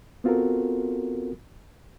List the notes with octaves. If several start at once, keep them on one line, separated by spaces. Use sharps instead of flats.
B3 C4 F4 F#4 A4 A#4